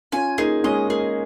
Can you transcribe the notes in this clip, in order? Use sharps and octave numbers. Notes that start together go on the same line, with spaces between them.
C#4 F4 G#5
A#3 D#4 G#4
G#3 C#4 D#5
A#3 G#4